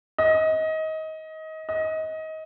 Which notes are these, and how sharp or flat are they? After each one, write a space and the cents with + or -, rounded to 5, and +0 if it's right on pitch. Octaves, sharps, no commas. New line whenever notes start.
D#5 +25
D#5 +25